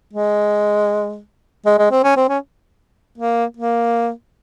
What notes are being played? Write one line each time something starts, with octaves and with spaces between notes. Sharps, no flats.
G#3
G#3
G#3
C4
C#4
C4
C#4
A#3
A#3